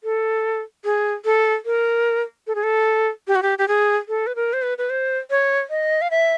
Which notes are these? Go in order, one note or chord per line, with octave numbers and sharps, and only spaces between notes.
A4
G#4
A4
A#4
A4
G#4
A4
G4
F#4
G4
G4
G#4
A4
B4
A#4
C5
B4
B4
C5
C#5
D#5
F5
E5